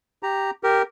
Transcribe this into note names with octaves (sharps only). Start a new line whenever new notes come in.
G4 A#5
G4 A#4